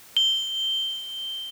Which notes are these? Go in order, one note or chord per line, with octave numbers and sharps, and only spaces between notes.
G7